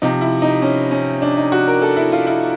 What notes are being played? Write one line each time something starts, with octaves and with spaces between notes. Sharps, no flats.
C3 F3 D#4
E4
D#4
C#4
C#4
D4
D#4
F#4
A#4
A4
E4
F4
E4